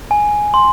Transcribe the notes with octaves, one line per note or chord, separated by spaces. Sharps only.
G#5
C6